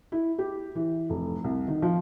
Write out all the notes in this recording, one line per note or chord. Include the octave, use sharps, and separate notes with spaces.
E4
G4
E3
F1
C2
D#3
F3